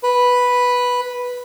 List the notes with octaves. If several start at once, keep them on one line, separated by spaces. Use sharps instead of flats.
B4